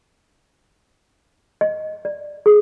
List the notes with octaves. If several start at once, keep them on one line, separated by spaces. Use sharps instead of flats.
D#5
D5
G#4